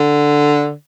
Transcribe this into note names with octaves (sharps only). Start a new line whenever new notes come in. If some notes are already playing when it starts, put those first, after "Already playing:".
Already playing: D3